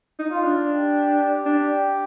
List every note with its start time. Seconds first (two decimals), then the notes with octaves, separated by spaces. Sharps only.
0.19 D#4
0.31 F4
0.44 D4
0.69 G4
1.46 D4